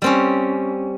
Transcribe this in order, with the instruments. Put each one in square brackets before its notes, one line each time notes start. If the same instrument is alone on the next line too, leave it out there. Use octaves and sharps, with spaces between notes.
[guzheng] G3 C4 C#4